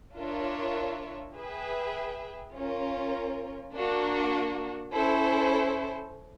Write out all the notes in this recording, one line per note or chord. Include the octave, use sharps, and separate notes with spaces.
D4 F4 A#4 C#5 E5
G#4 B4 E5 G5
C#4 F4 A#4
A#3 D4 F#4
C#4 E4 A4 C5